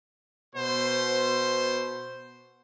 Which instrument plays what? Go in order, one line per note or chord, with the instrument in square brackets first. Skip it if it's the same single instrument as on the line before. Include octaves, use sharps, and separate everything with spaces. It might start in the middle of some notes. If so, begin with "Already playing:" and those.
[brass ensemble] B2 C5